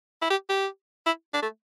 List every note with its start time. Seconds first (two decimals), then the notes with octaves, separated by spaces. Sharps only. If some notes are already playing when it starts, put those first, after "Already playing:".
0.22 E4
0.31 G4
0.49 G4
1.06 E4
1.34 D4
1.42 A3